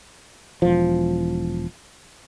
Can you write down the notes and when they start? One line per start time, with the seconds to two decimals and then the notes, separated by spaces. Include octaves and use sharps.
0.62 E1 F3